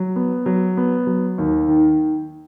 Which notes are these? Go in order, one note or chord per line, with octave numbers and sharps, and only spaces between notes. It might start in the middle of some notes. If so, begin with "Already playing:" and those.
Already playing: F#3
B3
F#3
B3
F#3
D#2
D#3